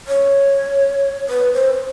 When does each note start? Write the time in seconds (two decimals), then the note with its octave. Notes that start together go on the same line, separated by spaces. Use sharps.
0.08 C#5
1.29 B4
1.54 C5